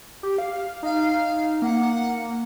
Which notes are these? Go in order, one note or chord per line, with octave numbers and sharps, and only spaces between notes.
G4
F5
D#4 F5
A#3 F#5